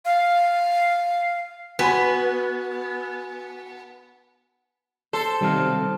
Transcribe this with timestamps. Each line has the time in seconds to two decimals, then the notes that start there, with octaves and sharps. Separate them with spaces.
0.05 F5
1.79 B3 F#4 G#5 B5
5.13 A4 C5
5.41 B1 C3 D#3 G3 D#4 F5